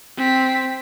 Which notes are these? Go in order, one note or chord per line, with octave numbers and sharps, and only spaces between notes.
C4 B6